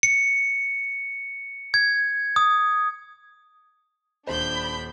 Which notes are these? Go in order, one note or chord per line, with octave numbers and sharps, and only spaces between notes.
C#7
G#6
D#6
D#1 D4 C5 B5 G6